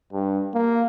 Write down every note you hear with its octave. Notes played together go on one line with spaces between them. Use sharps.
G2
A#3